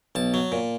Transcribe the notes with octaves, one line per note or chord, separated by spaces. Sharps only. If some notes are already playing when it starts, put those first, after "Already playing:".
B1 A5
F#3
A#2